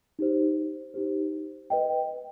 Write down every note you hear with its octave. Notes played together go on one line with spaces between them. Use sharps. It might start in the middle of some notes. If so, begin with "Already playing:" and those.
D#4 G4 C5
D#4 G4 C5
B4 D#5 G5